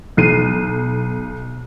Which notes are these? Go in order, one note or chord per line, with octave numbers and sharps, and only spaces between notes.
B1 C7 D#7